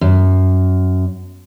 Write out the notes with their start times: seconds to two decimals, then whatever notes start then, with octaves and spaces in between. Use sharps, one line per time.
0.01 F#2